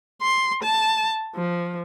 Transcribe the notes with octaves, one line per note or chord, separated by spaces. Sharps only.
C6
A5
F3